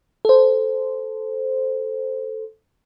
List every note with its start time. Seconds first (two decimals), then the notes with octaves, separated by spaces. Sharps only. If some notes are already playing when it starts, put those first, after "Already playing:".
0.25 A4 C5